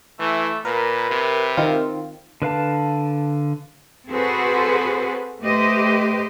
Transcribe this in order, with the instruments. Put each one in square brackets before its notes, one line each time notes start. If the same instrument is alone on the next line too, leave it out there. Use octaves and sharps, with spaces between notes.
[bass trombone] E3 [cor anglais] A3
[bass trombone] A#2 [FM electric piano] A#4 [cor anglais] B4
[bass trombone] C3
[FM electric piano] D#3 C4 F4
[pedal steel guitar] D3 B4 F5 A5
[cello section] C4 F#4 G#4 A4 B4 C5
A3 G4 B4 C5 D#5